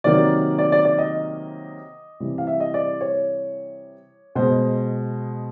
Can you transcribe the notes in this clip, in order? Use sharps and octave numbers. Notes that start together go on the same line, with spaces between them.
C3 D#3 F#3 A#3 D5
D5
D5
D5
D#5
C3 E3 G3
F5
E5
D#5
D5
C#5
B2 G#3 C5